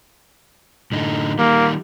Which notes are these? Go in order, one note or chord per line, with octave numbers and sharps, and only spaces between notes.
A2 D3 D#4
D#3 G3 A#3